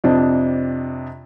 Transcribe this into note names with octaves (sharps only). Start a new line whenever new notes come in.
F2 C3 D4 D#5